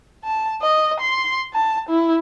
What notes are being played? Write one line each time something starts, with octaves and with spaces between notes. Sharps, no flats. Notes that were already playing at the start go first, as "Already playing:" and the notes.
A5
D#5
C6
A5
E4